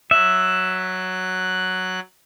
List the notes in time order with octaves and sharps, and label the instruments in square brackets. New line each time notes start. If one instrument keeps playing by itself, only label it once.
[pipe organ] F#3 F#6 [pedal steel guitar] E5